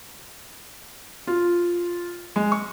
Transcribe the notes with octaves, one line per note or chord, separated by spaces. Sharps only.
F4
G#3
C#6